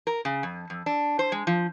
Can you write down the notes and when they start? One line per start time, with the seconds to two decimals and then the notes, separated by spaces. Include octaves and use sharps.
0.07 A#4
0.25 C#3
0.43 F2
0.70 F2
0.86 D4
1.19 C5
1.32 G#3
1.47 F3